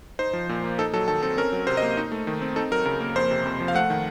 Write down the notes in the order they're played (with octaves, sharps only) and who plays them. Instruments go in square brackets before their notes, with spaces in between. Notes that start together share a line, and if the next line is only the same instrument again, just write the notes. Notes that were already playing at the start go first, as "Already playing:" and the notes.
[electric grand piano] D#4 C5
F3
A#2
A#3
D#4 A4
F#3 A4
D#3 A4
C4 A4
C#4 A#4
F#3
C3 C5
D#5
A#3
D#4
A3
D#3
C4
D#4 A4
F#3 A#4
C#3 A#4
A#3
F2 C5
C3
F2
F3
F5
A3 F#5
D#3